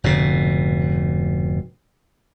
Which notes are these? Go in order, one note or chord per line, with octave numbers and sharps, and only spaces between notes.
F1 G#2 B2 D3